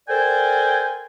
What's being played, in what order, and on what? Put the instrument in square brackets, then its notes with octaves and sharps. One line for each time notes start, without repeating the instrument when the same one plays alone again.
[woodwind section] A4 A#4 C5 D5 G5 G#5